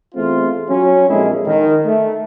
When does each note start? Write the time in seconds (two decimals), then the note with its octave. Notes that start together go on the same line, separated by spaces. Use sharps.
0.15 E2 A3 C4 F4
0.68 F#3 C#4
1.08 A#1 F2 G#3 E4 G#4
1.46 D#3
1.85 A3